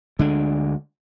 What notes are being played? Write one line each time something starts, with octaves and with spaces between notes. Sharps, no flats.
D2 D3 G#3 D4